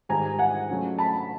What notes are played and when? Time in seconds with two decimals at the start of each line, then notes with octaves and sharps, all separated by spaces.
0.09 G#2 D#3 G3 G#5 A#5
0.39 F#5 G#5
0.70 C#3 F#3 A3
0.99 A5 B5